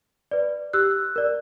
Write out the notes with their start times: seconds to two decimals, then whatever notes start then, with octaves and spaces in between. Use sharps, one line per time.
0.31 B4 D5
0.73 G4 E6 F#6
1.16 A#4 D5